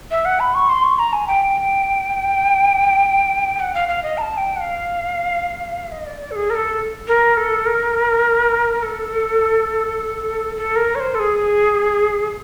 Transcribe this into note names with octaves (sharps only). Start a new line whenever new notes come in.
E5
F#5
B5
C#6
C6
C#6
A#5
G#5
G5
F#5
F5
F5
D#5
A#5
A5
G5
F#5
F5
D#5
D5
D5
A4
G#4
A#4
A4
A#4
A4
A#4
A4
A4
A#4
C#5
C5
A4
G#4